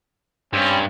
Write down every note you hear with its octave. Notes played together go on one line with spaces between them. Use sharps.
G2 C4 C#4